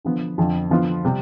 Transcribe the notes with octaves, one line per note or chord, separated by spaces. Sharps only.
D3 F3 B3
F2 D3 F3
D3 F3 B3 F4
C3 G3 C4